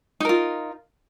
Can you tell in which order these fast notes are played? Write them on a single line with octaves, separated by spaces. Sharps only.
D#4 A#4 F4